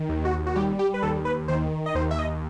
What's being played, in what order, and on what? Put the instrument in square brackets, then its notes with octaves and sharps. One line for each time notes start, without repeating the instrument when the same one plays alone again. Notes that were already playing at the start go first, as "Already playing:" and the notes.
Already playing: [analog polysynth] D#3
D#2
F#4
F#4
G3 G4
G4
B4
D#2 A4
B4
D#3 C5
D#5
D#2 C5
E5
D#5